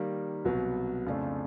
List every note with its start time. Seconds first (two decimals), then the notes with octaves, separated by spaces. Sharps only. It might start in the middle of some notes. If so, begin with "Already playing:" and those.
Already playing: D#3 G3 A#3
0.45 C2 B2 F#3 B3
1.06 F2 C#3 F3 A3 D4